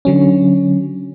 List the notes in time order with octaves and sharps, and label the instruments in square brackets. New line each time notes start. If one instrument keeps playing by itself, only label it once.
[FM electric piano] D3 F#3 C#4